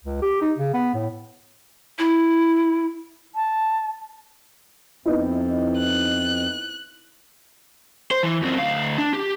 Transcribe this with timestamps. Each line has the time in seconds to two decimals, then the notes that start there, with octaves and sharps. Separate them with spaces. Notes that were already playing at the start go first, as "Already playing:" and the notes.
0.04 C#2
0.22 G4
0.41 D#4
0.58 C#3
0.74 B3
0.94 A2
1.99 E4
3.35 A5
5.06 F2 B3 D#4 E4
5.78 F#6
8.11 C5
8.23 E3
8.42 F#2 C4
8.59 D2 F5
8.98 D4
9.13 G4